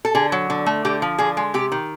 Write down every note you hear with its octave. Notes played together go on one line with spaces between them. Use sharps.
A4
D3 G#4
F#3
D3
A3
D3 G4
F3
D3 G#4
G#3
C3 G4
D#3